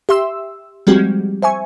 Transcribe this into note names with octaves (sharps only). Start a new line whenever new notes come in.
G4 E5 C6 E6
F3 G3 G#3 C4 F#4 G4
C5 E5 G#5 C#6